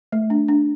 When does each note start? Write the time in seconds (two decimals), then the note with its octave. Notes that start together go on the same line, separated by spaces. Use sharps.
0.12 A3
0.30 D4
0.48 D4